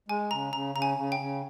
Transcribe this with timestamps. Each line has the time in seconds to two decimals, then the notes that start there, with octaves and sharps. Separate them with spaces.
0.08 G#3 G#5
0.31 C#3 A#5
0.53 C#3 A#5
0.75 C#3 A#5
0.82 G#5
0.97 C#3
1.12 G5
1.19 C#3